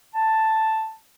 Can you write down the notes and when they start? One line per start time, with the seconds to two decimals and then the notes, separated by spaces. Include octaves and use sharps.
0.14 A5